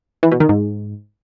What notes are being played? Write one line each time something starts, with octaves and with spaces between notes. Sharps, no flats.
E3
B2
D#3
G#2